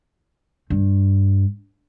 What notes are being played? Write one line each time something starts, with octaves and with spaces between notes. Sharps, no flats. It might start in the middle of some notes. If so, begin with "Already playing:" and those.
G2